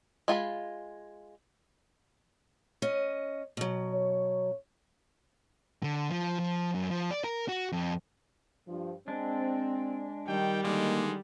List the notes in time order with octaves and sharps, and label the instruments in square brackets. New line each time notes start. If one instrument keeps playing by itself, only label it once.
[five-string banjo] G#3 F4 G#5 B5
[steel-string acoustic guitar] C#4 D#5
B2 F#3
[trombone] C#5
[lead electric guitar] D3
F3
F3
F#2
F3
D5
A#4
F#4
F2
[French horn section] G2 F3
[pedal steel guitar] G#3 D4 [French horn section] C4
[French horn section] D#3 D#5 [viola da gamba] G3 [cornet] G5
[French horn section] D3 D#3 [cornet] G#3 [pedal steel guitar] A#3 D6